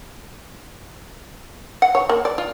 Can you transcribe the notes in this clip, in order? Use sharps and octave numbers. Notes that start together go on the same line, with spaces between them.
F#5
C#5
A#3
D5
F4